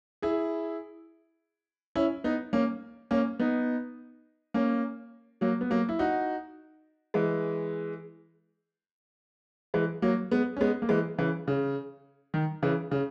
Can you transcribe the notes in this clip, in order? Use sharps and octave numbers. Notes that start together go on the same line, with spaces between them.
E4 G#4
C#4 E4
B3 D#4
A#3 C#4
A#3 C#4
B3 D#4
A#3 C#4
F#3 A#3
B3
F#3 A#3
E4
D#4 F#4
E3 G#3
E3 G#3
F#3 A#3
G#3 B3
C#4
G#3 B3
A#3
E3 G#3
C#3 E3
C#3
D#3
C#3 E3
C#3